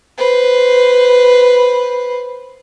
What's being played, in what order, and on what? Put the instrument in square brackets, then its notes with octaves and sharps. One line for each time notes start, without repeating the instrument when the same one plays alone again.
[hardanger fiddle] B4 C5